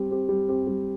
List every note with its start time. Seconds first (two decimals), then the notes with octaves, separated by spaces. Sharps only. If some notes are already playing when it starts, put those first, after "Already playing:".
Already playing: G3 C4 G4
0.10 C4 G4
0.29 G3
0.48 C4 G4
0.67 G3